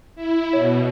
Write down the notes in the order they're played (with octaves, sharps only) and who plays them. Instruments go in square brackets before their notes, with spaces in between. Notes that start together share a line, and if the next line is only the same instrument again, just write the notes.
[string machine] E4
[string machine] B2 [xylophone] C#5